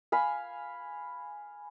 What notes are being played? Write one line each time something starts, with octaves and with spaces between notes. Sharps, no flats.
F5 G#5 B5